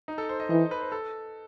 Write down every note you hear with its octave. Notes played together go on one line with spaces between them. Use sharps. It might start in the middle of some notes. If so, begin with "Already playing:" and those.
D#4
A4
C5
D#5
E3 D#5
B4
C5
A4